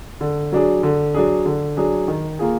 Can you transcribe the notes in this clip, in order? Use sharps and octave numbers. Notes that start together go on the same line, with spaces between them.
D3
F#3 D4 G#4
D3
F#3 D4 G#4
D3
F#3 D4 G#4
D#3
A#3 F4 G#4